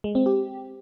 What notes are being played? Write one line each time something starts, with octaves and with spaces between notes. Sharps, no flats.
G#3
C4
G4